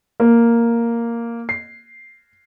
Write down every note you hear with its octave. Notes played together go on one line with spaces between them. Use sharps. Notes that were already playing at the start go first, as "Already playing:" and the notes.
A#3
C7